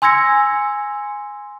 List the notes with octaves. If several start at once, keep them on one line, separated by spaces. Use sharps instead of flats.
G#5 C6 E6 G#6 A#6 C#7